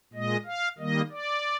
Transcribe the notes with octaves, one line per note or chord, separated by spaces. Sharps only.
A#2 G#3 D#5
F5
D#3 G3 A#3 D#5
D5